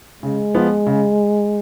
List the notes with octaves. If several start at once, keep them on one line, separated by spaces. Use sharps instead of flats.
C#3 G#3
F3 B3
C#3